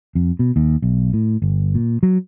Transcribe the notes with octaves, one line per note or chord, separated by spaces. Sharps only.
F2
B2
D#2
B1
A2
G1
A#2
F#3